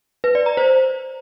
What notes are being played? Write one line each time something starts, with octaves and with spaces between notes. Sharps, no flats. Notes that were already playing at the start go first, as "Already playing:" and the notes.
B4
D5
A#5
C5